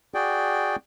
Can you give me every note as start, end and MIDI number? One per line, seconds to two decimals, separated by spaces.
0.14 0.76 66
0.14 0.76 68
0.14 0.76 74
0.14 0.76 79